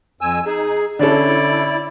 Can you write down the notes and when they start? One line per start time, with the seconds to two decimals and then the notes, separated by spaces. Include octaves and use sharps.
0.21 F2 G#5 E6
0.45 D#4 G#4
0.99 D3 C#4 E4 A4 D5